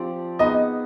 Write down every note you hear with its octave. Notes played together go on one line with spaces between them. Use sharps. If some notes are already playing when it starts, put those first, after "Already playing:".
Already playing: F3 C4 G4 D5
B3 D#4 G#4 D#5